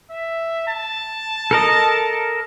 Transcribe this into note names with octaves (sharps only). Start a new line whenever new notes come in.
E5
A5
A4 A#4 D#5